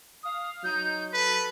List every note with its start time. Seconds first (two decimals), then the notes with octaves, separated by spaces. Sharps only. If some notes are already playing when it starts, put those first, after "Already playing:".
0.23 F5 D#6
0.64 F#3 D#4 G6
1.13 A4 B4 B6